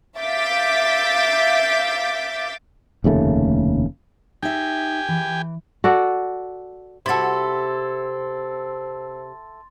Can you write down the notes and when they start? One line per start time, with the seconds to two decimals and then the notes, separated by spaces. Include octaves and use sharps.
0.18 E5 F5 D6 G6 A6 B6
3.04 F1 D#2 C#3 A3
4.43 D#4 G4 E5 G5 G#5
5.08 E3
5.84 F#4 A4 D5
7.06 C3 C4 E4 F#4 A4 C6 A6